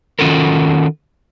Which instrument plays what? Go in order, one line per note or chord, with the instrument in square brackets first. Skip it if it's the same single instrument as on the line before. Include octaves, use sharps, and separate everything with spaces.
[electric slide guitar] D#3 C#4 F4 F#4 A4 A#4